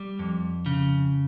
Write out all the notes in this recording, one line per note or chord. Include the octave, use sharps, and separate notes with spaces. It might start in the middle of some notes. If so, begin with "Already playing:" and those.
Already playing: G3
F2
C#3